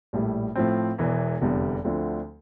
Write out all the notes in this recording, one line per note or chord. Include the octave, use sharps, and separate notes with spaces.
A#1 A2 G3
A2 F3 C4
E1 E2 E3
F1 E2 D3 G3
D2 D3 F3 A3 C4